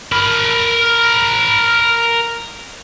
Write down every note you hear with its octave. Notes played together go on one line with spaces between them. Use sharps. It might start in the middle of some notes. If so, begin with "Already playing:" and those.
A#4 B5